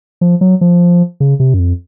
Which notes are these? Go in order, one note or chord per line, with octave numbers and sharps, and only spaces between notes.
F3
F#3
F3
C#3
C3
F#2
F2